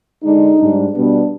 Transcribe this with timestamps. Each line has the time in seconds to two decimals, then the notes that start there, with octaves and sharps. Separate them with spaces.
0.22 D3 G#3 D4 D#4
0.57 G#2 G3 D4
0.92 B2 G3 B3 D4